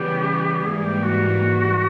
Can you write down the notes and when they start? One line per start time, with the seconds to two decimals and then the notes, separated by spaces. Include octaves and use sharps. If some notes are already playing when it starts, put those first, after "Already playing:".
Already playing: C#3 E3 G3 B3 G4
0.66 G#2 E3 G3 A#3 G#4
0.84 G4
1.02 F#4